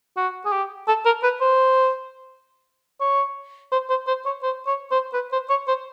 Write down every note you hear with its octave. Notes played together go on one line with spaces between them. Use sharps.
F#4
G#4
G4
A4
A#4
B4
C5
C#5
C5
C5
C5
C#5
C5
C#5
C5
B4
C5
C#5
C5